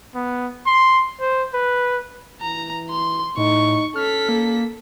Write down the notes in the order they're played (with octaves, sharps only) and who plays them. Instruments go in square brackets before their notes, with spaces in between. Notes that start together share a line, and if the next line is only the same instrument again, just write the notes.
[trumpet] B3
C6
C5
B4
[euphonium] E3 [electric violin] A#5
[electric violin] C6
[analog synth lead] A2 [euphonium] D#4 [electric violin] C#6
[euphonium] C#4 [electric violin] A4 B6 [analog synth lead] F6
[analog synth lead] A#3